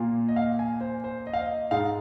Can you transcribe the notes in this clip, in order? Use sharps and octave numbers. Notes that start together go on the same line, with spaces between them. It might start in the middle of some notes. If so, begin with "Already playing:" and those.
Already playing: A#2 A#3 F4
D#5
F5
G#5
C5
C5
D#5
F5
D#5
G#2 G#3 D#4 F5